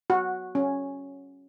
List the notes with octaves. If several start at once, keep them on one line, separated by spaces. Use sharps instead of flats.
F#4
C#4